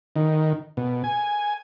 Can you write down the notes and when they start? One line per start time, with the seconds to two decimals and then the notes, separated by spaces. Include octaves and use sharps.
0.16 D#3
0.77 B2
1.04 G#5